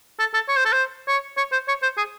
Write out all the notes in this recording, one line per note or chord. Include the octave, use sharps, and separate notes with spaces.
A4
A4
C#5
C5
A4
C5
C#5
C#5
C5
C#5
C5
G#4